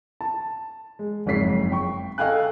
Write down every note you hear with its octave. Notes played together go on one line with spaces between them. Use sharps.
A5
G#3
F#1 F2 G#2 C#5 B6 C7
G5 C#6
A4 D#5 F5 G5 G#5 F#6